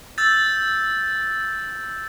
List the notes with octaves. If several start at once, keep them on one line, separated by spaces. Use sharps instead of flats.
E6 G6 A6